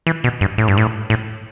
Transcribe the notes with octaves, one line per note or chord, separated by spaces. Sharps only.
E3
B2
G2
A2
G2
A2
A2